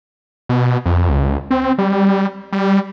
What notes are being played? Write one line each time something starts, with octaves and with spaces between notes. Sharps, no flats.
B2
F2
C#2
C4
G3
G3